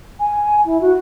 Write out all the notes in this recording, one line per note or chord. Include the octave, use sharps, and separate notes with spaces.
G#5
E4
F#4